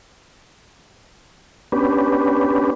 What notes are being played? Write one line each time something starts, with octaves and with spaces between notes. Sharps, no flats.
B3 C#4 D4 G4 B4